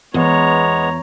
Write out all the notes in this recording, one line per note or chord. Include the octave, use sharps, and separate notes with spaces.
E2 G#3 B3 C#5 A#5